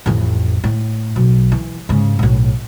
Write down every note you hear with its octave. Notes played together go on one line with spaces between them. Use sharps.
A1 F2
A2
B1
E3
G#2 C#3
B1 A2